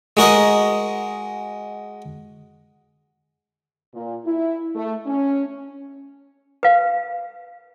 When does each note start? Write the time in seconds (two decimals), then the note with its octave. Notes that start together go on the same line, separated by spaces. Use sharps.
0.17 G#3 F#4 A#4 D#5
3.94 A#2
4.25 E4
4.75 A3
5.06 C#4
6.63 B4 F5